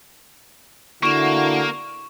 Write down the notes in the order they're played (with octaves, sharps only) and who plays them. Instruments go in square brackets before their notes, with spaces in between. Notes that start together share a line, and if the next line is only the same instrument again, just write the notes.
[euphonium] D3 [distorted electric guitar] A#3 [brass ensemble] E4 F#4 [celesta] C#6 E7